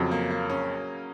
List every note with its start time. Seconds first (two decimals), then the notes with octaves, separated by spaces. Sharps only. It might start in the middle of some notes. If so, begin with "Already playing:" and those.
Already playing: F2 C#3 F#3
0.11 A#3
0.30 A#3
0.50 C#4